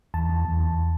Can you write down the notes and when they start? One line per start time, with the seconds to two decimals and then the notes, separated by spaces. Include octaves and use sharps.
0.14 E2 A5
0.29 E2
0.45 E2
0.60 E2